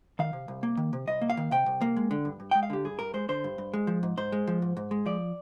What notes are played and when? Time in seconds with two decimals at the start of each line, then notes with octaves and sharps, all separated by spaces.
0.19 D#3 F5
0.33 C3
0.48 C2
0.63 A#3
0.77 D#3
0.93 C3
1.07 C2 D#5
1.21 A#3
1.30 F5
1.37 D#3
1.51 C3 G5
1.66 C2
1.81 A#3
1.97 G#3
2.11 D3
2.25 G2
2.40 G2
2.51 G#3 G5
2.63 F5
2.70 D3 G4
2.85 G2 G#4
2.99 G2 A#4
3.14 G#3 C5
3.29 D3 C5
3.44 G2
3.58 G2
3.73 G#3
3.87 F3
4.03 G#2
4.17 G#2 C5
4.32 G#3
4.47 F3
4.62 G#2
4.77 G#2
4.91 G#3
5.06 F3 D5